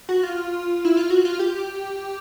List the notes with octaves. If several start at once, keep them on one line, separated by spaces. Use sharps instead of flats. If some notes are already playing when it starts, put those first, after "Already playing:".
F#4
F4
E4
F4
F#4
F4
G4